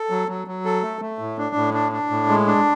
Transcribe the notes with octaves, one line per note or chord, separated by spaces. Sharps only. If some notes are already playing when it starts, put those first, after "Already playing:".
Already playing: A4
F#3
F#3
F#3
A4
A3
A3
A2
D4
A2
D4
D4
A2
G#3
D4